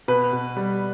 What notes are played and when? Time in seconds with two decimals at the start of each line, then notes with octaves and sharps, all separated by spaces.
0.08 B2 B4
0.33 B2
0.57 G3